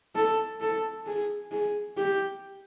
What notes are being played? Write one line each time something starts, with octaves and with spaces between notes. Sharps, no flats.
A4
A4
G#4
G#4
G4